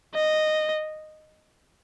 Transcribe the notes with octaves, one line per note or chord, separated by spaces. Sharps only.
D#5